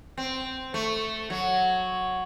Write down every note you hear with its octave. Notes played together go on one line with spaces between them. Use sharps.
C4
A3
F#3